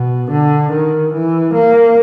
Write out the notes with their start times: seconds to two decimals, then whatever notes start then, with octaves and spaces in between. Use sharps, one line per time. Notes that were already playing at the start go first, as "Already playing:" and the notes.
Already playing: B2
0.31 D3
0.72 D#3
1.13 E3
1.54 A#3